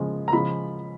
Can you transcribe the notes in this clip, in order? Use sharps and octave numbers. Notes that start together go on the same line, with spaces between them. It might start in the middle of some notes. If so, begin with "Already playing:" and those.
Already playing: C#3 F3 G#3
A#5
C#3 F3 G#3 B5